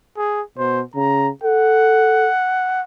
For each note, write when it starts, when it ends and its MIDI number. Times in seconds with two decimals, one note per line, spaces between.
0.17 0.42 68
0.58 0.82 47
0.58 0.81 72
0.95 1.29 49
0.95 1.28 82
1.44 2.29 69
1.44 2.82 78